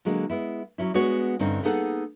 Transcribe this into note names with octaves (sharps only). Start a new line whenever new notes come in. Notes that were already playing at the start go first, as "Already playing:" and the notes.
D3 F#3 G#3 A#3
G#3 B3 E4
F#3 C#4 E4
G#3 B3 D4 F#4 C#5
G2 D3 C4 C#4 D#4
A#3 B3 D#4 G#4 A4 F#5